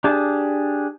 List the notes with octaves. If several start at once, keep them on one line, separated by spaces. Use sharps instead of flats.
D4 G4 G#4 A5